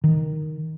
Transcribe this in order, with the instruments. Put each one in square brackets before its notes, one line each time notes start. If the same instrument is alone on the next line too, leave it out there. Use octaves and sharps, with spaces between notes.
[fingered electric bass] D#3